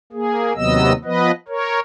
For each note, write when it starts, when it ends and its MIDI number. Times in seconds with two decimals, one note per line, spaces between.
0.13 0.53 58
0.13 0.53 68
0.56 0.93 39
0.56 0.93 48
0.56 0.93 54
0.56 0.93 59
0.56 0.93 75
0.56 0.93 88
1.05 1.31 53
1.05 1.31 59
1.05 1.31 71
1.05 1.31 75
1.48 1.80 70
1.48 1.80 73